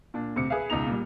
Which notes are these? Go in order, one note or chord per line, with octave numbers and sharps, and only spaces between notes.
A#2 D4
D2 C3 C#7
G#4 B4 E5 F5
C#2 B2 D#4 A#5 F7
A#2 G3